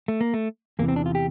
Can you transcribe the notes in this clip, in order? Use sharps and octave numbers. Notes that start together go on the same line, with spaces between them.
A3
A#3
A3
E2 C3 E3 A#3
C4
D4
F4
G4